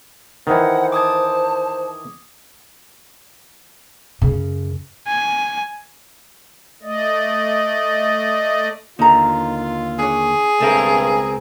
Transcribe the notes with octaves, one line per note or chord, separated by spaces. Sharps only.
D#3 E3 C5 F#5
A5 D6 D#6 G#6
F#2 C#3
G#5
A3 D5 D#5
D#2 D3 D#4 F4 A#5
D4 G#4 C#5
C#2 G2 C4 A4 A#4 E5